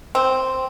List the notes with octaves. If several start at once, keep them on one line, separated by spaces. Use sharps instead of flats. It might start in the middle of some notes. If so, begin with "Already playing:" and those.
C4